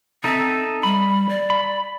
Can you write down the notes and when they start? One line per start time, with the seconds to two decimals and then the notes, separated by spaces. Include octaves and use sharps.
0.24 C4 D#4 A4 E5
0.83 G3 B5
1.29 D5
1.50 B5